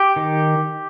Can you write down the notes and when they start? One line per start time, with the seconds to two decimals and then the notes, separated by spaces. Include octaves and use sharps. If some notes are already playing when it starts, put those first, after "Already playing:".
Already playing: G4
0.16 D#3